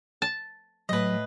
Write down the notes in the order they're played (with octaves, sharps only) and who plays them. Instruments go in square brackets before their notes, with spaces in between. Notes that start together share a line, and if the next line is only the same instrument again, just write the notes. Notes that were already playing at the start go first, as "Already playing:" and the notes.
[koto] A5
[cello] A2 [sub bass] F#3 [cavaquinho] B4 D#5